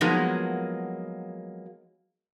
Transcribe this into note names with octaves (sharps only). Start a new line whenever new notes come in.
F3 F#3 G#3 A#3 B3 D#4